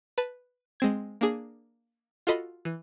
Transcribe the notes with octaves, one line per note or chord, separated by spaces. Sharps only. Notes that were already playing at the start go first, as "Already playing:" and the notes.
B4 A5 E7
G#3 C4 G#6
A#3 D4 G#4
F4 F#4 A4 D#5 B5 C6
E3